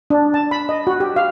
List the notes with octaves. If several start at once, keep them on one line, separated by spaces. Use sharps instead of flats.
D4
A5
B5
D#5
F#4
G4
F5